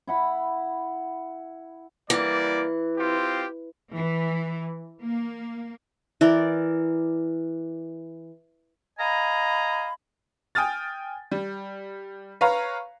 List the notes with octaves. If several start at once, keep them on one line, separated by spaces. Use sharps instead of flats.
E4 F#5 B5
E3 G3 A#3 D5
C4 F4 G4
E3
A#3
E3 A#4 D5
D#5 F5 G#5 A#5 B5
G5 G#5 D#6 F6 A6
G3
B4 C#5 F5 A#5